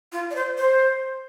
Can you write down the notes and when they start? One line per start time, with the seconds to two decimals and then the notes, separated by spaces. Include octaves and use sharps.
0.12 F4
0.31 D5
0.35 C5
0.58 C5